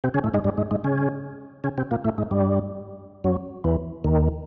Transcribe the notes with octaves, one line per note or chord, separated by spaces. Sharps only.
C3 C4
C#3 C#4
A2 A3
G#2 G#3
G2 G3
G#2 G#3
G#2 G#3
C#3 C#4
C#3 C#4
C3 C4
A#2 A#3
A2 A3
G#2 G#3
G2 G3
F#2 F#3
E2 E3
D#2 D#3